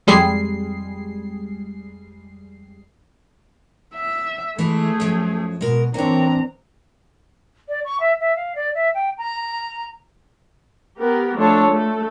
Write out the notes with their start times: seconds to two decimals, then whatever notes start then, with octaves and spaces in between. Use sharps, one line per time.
0.07 F2 G3 G#3 G#4 C7
3.94 E5
4.58 E3 G#3 A3 E4 G#4
5.00 F#2 F3
5.61 B2 G#3 A#4
5.94 E3 A#3 C4 D4 C#5 A#5
7.69 D5
7.85 C#6
8.00 E5
8.20 E5
8.36 F5
8.55 D5
8.75 E5
8.94 G5
9.18 A#5
10.98 B3 G4 A#4
11.36 F3 A3 D4 A4 C#5 A5
11.69 A3 A4